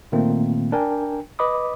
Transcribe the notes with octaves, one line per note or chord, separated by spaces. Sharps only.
A#2 D#3 A3 A#3 C4
D4 A#4 G5 G#5
B4 D#5 B5 D6 D#6